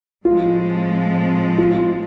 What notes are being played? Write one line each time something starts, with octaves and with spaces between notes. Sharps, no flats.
A2 F3 G#3 C4 F4
F4